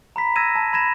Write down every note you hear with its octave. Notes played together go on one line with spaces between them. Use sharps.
A#5 B5 B6
E6 G#6 A#6 D#7 E7
A5
B5 G#6 A#6 E7